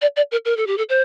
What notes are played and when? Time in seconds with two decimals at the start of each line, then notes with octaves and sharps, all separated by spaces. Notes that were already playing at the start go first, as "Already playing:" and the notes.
0.02 D5
0.17 D5
0.32 A#4
0.45 A#4
0.57 A4
0.67 G4
0.78 A4
0.89 C5